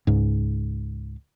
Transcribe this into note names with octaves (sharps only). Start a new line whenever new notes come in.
C#2 G#2